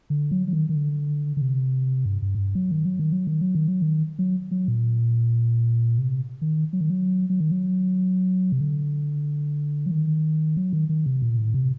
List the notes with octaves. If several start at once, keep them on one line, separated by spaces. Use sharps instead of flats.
D3
F#3
F#3
D#3
D#3
D3
D3
C3
G2
G2
A2
G2
F#3
D#3
F#3
D#3
F#3
D#3
F#3
D#3
F#3
D#3
F#3
F#3
A#2
C3
D#3
F#3
D#3
F#3
F#3
D#3
F#3
C3
D3
F#3
D#3
F#3
D#3
D#3
C3
A#2
A2
C3